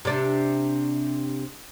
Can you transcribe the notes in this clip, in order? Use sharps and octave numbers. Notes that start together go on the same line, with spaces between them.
C3 D4